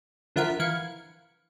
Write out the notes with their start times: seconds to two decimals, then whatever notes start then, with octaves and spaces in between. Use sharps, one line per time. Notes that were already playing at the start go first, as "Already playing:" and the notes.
0.36 D3 F3 E4 A#4 F#5 B6
0.60 E3 F5 G#6 C#7